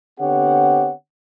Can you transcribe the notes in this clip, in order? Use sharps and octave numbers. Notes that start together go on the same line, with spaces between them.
D3 B3 C4 G4 C#5 F#5